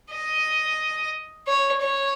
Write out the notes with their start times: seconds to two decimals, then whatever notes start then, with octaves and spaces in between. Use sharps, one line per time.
0.12 D#5
1.47 C#5
1.82 C#5